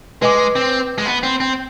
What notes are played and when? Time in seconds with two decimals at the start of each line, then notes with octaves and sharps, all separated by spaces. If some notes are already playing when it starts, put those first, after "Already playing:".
0.22 G#3 B4 D#5 G#5 D6
0.55 C4
0.98 G#3
1.06 B3
1.23 C4
1.40 C4